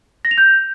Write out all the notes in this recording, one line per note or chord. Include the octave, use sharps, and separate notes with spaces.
A#6
F7
G6